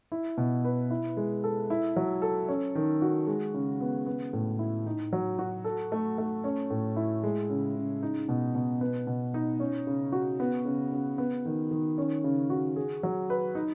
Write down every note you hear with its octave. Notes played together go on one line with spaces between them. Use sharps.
E4
B2
B4
E4
G#3
A4
E4
F#3
A4
C#4
D#3
F#4
G#3
C#3
B3
B3
A2
E4
D#4
F#3
F#4
A4
A3
A3
C#4
A2
E4
G#3
C#3
C#3
D#4
B2
B2
B3
B2
D#4
C#4
C#3
F#4
B3
C#3
C#3
B3
D#3
D#3
C#4
C#3
F#4
G#4
F#3
B4
D#4